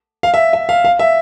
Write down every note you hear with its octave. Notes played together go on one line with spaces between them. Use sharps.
F5
E5
E5
F5
F5
E5